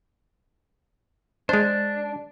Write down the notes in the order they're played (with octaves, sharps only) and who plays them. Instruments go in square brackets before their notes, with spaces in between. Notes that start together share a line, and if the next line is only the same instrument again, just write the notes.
[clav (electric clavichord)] G#3 C5 [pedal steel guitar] D4